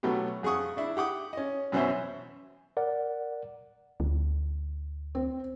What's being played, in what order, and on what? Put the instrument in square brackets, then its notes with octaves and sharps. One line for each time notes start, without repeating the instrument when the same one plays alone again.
[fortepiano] B2 F#3 A3 B3 G4
F2 G#4 F#5 C#6 D#6
D4 E4
G4 F#5 D6 D#6
C#4 D#5
F#2 B2 E3 C#4 C5 E5
[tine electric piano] A#4 D5 F#5
[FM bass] D2
[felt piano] C4